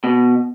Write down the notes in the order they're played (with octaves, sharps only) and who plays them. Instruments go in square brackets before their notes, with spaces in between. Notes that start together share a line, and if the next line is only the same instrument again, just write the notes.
[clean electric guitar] B2